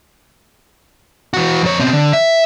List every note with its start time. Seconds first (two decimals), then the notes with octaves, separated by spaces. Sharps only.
1.34 E3 F#4
1.62 F2 C#5
1.79 B2 C4
1.93 D3
2.13 E5